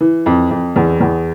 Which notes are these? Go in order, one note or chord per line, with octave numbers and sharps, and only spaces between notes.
E3
F2
F2
E2
E2